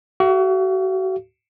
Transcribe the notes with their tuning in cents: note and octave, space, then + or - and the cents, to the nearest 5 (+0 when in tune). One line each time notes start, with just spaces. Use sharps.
F#4 +35 A4 -45 F5 -35